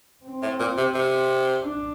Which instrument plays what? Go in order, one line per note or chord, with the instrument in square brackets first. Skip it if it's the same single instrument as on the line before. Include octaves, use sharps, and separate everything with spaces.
[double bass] C4
[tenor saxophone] A2
A#2
C3
C3
[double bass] D4